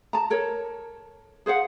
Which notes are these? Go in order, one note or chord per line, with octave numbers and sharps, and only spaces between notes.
A5 A#5
A4 A#4 C#5
G#4 C5 F5 F#5